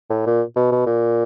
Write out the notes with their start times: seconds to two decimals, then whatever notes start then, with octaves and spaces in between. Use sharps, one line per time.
0.10 A2
0.26 A#2
0.56 B2
0.72 B2
0.86 A#2